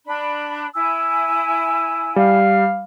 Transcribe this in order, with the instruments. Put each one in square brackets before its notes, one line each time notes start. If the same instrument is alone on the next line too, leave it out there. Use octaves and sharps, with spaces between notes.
[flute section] D4 B5
[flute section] E4 G#5 [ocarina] E6
[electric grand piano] G3 [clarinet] F5